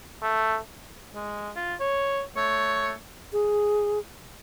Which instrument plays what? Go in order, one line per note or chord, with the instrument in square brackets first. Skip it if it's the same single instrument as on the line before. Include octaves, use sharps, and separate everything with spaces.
[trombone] A3
[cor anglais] G#3
F4
C#5
[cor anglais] A3 [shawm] C#5
[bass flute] G#4